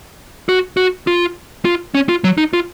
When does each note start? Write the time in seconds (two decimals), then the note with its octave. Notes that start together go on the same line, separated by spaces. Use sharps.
0.49 F#4
0.77 F#4
1.07 F4
1.65 F4
1.95 C#4
2.09 F4
2.24 F#3
2.38 D#4
2.53 F4